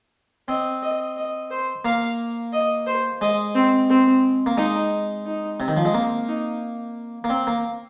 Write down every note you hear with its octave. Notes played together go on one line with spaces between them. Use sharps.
C4 D#5
D#5
D#5
C5
A#3 F5
D#5
C5
G#3 D#5
C4
C4
A#3
G#3 D#4
D#4
C3
D#3
F3
G#3
A#3 C4
D#4
A#3
C4
A#3